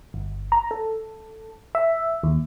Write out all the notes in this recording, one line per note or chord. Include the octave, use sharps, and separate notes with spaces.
G1
A#5
A4
E5
D#2